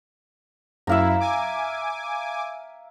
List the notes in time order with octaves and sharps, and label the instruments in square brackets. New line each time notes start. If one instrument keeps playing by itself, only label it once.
[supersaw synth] F#2 E4 [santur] E5 F5 A#5
[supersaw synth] G#5 D6